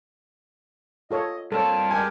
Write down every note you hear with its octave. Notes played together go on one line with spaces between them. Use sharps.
F4 A4 C#5 D#5
G2 A#3 C4 F4 A4 C#5 A5
G#3 G4 A#4 G#5